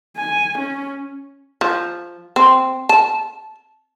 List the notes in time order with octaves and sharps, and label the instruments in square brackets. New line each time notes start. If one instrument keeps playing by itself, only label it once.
[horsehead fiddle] G#5
C#4
[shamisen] F3
C4
A5